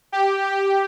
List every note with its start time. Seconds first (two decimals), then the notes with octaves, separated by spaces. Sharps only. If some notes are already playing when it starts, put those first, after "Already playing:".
0.12 G4
0.43 G4